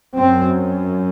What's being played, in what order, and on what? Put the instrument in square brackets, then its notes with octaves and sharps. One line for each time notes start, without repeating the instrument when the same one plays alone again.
[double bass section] F#2 C4